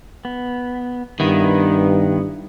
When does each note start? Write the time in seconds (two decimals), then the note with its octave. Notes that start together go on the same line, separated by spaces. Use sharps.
0.25 B3
1.20 G2 D#3 B3 E4 B4